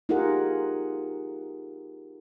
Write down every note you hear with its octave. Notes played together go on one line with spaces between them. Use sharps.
D#4 F4 G4 G#4 A#4 F#5